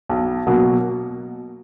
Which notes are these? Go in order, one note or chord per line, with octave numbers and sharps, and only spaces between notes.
B1
B2 F#3 A#3